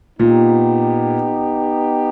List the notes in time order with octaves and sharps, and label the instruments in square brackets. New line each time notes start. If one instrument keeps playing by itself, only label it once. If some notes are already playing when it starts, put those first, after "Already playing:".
[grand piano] A#2 [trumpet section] B3 D#4 G4